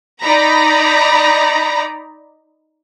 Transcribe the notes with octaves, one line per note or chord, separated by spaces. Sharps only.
D#4 D5 A#5 B5 A#6